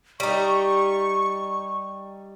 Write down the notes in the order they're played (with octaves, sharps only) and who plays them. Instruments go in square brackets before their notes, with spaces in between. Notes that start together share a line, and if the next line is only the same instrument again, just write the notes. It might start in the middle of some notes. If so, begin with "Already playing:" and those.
[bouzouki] G3 D#4 [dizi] C#6